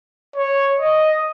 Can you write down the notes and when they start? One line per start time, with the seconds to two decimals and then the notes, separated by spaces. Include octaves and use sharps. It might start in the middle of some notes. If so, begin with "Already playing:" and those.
0.36 C#5
0.80 D#5